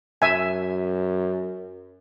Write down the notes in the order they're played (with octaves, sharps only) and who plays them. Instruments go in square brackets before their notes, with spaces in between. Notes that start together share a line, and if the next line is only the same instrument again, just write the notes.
[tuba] F#2 [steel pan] E5 G#5